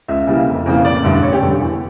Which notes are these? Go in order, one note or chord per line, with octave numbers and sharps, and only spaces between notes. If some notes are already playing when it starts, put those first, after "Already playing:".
C#2 E5
C#3 E3 G3 A#3
F1
F2 C#3 E3 A#3
A1 D5
G2 D3 A3
A1 C#5
G4
G2 D3 G3 A4
G4
E2